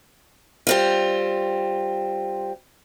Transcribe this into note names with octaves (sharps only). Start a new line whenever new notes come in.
G3 C4 F4